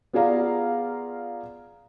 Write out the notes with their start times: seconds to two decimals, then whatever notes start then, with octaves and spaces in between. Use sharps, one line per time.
0.13 B3 F4 G#4 D5 F5 A#5